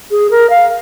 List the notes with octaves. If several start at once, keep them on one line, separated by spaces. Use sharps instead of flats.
G#4
A#4
F5